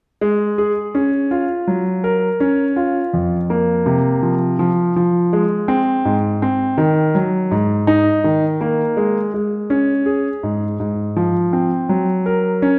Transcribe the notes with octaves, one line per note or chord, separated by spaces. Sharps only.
G#3
G#4
C#4
F4
F#3
A#4
C#4
F4
F2
A#3
C3
F3
F3
F3
G#3
C4
G#2
C4
D#3
F#3
G#2
D#4
D#3
A#3
G#3
G#3
C#4
G#4
G#2
G#2
F3
C4
F#3
A#4
C#4